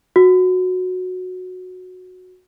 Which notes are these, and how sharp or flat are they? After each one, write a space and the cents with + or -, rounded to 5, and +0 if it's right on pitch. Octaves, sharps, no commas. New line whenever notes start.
F#4 -10